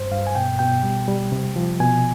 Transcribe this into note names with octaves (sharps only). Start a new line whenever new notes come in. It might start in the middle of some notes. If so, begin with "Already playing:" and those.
Already playing: G2 C5
G2 F5
G#5
B2 G5
B2 G5
G3
G3
C3
F3
B2 G#5